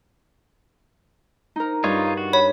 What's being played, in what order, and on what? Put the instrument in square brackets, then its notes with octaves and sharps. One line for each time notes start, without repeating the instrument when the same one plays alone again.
[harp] D#4 A#4
[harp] G2 [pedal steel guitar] D#4 F4 C#5
[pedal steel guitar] F#4
[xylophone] C#5 [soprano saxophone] B5